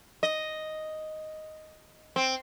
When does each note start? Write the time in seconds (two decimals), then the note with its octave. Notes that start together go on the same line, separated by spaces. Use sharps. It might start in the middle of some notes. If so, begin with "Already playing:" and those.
0.23 D#5
2.16 C4